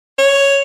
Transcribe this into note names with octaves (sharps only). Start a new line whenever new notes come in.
C#5